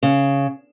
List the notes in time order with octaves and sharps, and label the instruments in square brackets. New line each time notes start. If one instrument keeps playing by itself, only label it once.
[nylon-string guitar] C#3